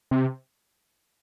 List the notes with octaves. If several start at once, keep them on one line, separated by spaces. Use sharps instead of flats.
C3